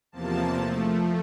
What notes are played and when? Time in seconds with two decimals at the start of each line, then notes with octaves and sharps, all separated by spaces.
0.12 E2 C3 F3 A#3 A5
0.56 F3 A3